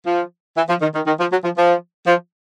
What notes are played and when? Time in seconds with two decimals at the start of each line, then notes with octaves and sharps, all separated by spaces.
0.06 F3
0.57 E3
0.69 F3
0.82 D#3
0.95 D#3
1.07 D#3
1.20 F3
1.32 F#3
1.44 F3
1.58 F3
2.07 F3